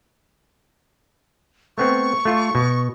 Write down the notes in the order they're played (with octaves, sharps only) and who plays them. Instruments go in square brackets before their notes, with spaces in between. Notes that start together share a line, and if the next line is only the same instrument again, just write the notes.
[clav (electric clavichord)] A3 B3 C4 [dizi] C#6
[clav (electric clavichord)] A3 F4
B2